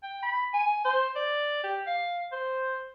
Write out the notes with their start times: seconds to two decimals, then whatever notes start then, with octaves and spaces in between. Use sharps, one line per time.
0.03 G5
0.22 B5
0.53 G#5
0.84 C5
1.16 D5
1.64 G4
1.87 F5
2.32 C5